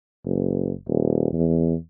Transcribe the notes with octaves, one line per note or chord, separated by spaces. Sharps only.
F#1
D#1
E2